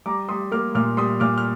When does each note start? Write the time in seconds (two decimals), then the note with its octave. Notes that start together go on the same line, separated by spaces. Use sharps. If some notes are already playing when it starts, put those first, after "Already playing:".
0.06 G3 A#5 D6
0.29 G3 C6 D#6
0.52 A#3 D6 F6
0.75 A#2 D6 F6
0.97 G3 C6 D#6
1.20 A#2 D6 F6
1.38 F6